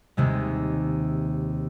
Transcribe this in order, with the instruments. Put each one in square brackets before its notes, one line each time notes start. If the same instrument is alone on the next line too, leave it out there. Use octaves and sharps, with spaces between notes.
[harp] D#2 C3 G#3